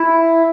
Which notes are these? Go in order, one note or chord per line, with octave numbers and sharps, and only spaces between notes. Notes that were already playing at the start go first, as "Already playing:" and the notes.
Already playing: E4